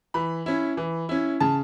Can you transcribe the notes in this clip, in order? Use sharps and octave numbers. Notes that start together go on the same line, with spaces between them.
E3 B5
C#4 E4
E3
C#4 E4
C#3 A5